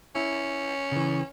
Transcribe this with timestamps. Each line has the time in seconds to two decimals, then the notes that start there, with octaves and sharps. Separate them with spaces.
0.16 C#4 E4
0.92 C#3 E3